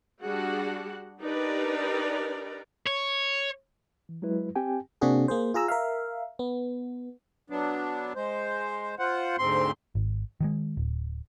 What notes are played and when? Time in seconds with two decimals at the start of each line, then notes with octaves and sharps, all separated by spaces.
0.21 G3 D4 F#4 G#4 F#5
1.20 D4 D#4 G4 A#4 B4 D5
2.87 C#5
4.09 E3
4.22 F#3 G#3 E4 B4
4.56 C4 G4 G5 G#5
5.01 C3 A#3 C4 D4 F#4 G#4
5.28 A#3 G#4 C5
5.54 F4 G#4 A#5 E6
5.68 A#4 E5 F5
6.39 B3
7.50 F#3 B3 D4
8.16 G#3 C5
8.99 F4 C5 F#5
9.38 D2 G#2 C4 C6
9.95 G#1
10.40 D#3 F3 G#3
10.77 D1